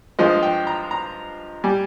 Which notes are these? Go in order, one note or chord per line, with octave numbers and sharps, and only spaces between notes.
G2 F3 G#3 D#5
G5
A#5
A#5
G3 G#5